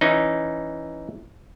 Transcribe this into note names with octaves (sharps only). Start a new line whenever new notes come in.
E3 C#4 D#4